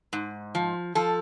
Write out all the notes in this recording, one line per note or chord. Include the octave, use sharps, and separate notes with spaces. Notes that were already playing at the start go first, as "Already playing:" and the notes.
G#2
F3
F3 A4